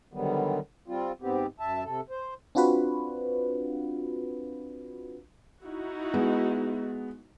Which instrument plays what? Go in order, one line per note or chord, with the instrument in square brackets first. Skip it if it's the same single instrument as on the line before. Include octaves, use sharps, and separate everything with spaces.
[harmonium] D3 D#3 F#3 G3 B3
G3 C4 F4
G#2 B3 C4 G4
F#2 E5 A5
C3 A4
C5
[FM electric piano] C4 D4 F4 F#4 B4
[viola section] D#4 E4 F#4
[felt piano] G#3 B3